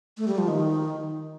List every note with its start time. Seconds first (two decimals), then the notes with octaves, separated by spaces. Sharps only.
0.18 A3
0.27 G3
0.38 F3
0.48 D#3